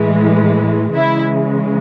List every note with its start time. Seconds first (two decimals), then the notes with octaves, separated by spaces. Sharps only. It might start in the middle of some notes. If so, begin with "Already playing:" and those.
Already playing: A2 E3 G#3
0.95 C#3 E3 G#3 E4